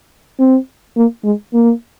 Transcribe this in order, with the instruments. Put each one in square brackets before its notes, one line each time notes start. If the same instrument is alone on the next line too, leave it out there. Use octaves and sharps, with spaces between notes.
[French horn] C4
A#3
G#3
A#3